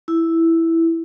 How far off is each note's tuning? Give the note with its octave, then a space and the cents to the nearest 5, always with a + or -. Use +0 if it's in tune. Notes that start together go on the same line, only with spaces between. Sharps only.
E4 +0